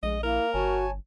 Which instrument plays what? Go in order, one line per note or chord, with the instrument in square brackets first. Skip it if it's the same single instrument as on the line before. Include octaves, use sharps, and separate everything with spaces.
[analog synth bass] A#1 [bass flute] G#3 [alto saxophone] D#5
[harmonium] A#3 [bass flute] E4 [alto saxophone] A#4
[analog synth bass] G1 [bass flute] F#4 [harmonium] C#5 G#5 A5